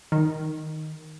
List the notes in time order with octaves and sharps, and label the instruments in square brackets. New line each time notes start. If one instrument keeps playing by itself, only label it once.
[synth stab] D#3